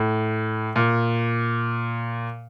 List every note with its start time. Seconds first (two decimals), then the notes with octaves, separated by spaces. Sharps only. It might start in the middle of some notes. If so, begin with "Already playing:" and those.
Already playing: A2
0.76 A#2